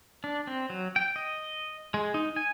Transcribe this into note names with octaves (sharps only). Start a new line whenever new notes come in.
D4
C4
F#3
G5
D#5
G#3
D#4
G#5